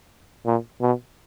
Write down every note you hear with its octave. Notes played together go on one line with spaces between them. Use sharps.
A#2
B2